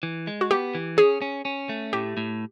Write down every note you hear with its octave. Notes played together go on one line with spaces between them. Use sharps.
E3
G#3
F#4
B3 G4
E3
C#4 G#4
C#4
C#4
A3
A2 G4
A2